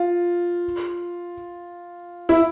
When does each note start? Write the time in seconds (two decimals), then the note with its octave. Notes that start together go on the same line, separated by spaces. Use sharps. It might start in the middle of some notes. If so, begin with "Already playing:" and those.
Already playing: F4
2.29 E4